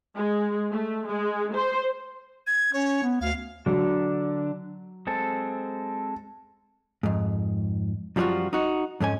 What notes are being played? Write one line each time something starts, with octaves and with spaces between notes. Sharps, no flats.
G#3
A3
G#3
C5
G#6
C#4 C#5
B3
D2 F5
D3 F#3 D4
G#3 C4 A4
F2 G#2
F#2 F3 G3 D#4 F4 F#4
D#4 F#4
F2 G#2 C#4 G#5